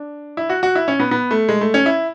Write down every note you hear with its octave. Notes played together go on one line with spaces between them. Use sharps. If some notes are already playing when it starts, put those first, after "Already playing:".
Already playing: D4
E4
F#4
F#4
E4
C#4
B3
B3
A3
G#3
A3
C#4
E4